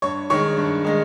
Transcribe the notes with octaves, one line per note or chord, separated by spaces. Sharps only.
G2 C#5 C#6
D#3 G#3 C#5 C#6
G2
D#3 G#3